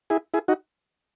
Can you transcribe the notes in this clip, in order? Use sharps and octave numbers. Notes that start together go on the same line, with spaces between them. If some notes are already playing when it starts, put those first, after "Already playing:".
E4 G#4
E4 G#4
D#4 F#4